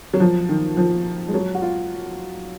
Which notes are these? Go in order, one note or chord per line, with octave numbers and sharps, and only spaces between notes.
F#3
F3
D#3
F3
G#3
F#3
F#4
F4